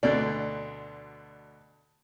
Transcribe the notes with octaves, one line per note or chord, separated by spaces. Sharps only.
D2 B2 D3 D5